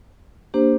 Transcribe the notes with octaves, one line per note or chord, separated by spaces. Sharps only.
A#3 D4 G4 C5